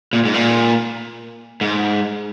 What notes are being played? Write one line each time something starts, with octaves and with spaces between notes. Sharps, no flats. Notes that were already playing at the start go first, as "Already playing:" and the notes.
A#2
G#2
A#2
G#2